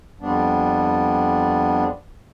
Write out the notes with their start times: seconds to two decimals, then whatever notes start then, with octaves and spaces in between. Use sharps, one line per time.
0.21 F2 G3 B3 D4